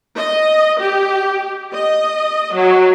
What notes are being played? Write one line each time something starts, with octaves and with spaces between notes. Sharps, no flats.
D#5
G4
D#5
F#3